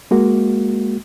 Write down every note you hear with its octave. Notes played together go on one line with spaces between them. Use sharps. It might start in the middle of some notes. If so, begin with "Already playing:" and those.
G#3 A#3 F#4